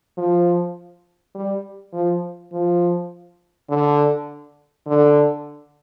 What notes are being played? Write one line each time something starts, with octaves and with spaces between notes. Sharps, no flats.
F3
G3
F3
F3
D3
D3